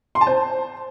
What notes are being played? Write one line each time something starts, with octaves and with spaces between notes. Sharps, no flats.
C6
A5
C5